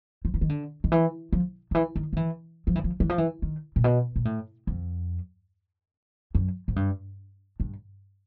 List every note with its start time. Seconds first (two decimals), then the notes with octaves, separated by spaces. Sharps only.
0.25 F3
0.34 E3
0.41 D#3
0.49 D3
0.84 D#3
0.92 E3
1.33 F3
1.71 D#3
1.75 E3
1.96 D#3
2.13 F3
2.16 E3
2.67 F3
2.75 E3
2.84 F3
3.00 E3
3.09 F3
3.18 E3
3.42 D#3
3.76 A#2
3.84 B2
4.16 A#2
4.25 A2
4.67 F2
6.35 F#2
6.68 G#2
6.76 G2
7.60 G2